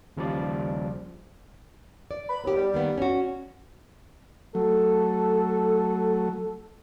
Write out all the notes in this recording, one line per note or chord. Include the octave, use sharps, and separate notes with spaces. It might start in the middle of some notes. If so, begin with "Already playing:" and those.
D#2 C#3 F3 G3 D5
D5
B5
D#2 B3 G4
G3
D#3 A#3 B3
C#4 F#4
F#3 A3 A4